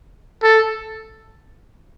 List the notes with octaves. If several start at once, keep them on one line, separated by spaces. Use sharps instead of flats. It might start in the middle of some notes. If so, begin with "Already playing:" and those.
A4